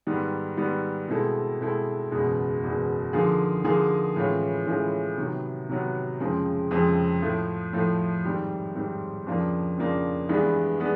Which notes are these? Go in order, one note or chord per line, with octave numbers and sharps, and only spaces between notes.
G#2 D#3 G3 B3
G#2 D#3 G3 B3
B2 G#3 C4 E4 A4
B2 G#3 C4 E4 A4
F#1 E2 B2 G#3
F#1 E2 B2 G#3
D3 F3 A#3 D#4 G#4
D3 F3 A#3 D#4 G#4
A2 E3 G#3 C#4 F4
A2 E3 G#3 C#4 F4
C3 D#3 F#3 B3
C3 D#3 F#3 B3
F2 C#3 F3 G#3 C4
F2 C#3 F3 G#3 C4
A2 F3 A3
A2 F3 A3
G#2 D#3 G3 C4
G#2 D#3 G3 C4
F2 C#3 F3 A#3 D4
F2 C#3 F3 A#3 D4
G2 E3 G#3 B3 D4
G#3 B3 D4